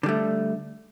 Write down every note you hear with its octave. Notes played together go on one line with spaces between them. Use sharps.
D3 G3 A3